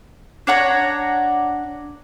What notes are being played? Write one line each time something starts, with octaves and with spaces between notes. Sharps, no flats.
D4 C#5 F#5 A#5